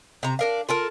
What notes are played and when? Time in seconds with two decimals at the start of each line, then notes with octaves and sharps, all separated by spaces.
0.23 C3 A#5
0.39 D4 A#4 F5
0.69 F4 A4 A#4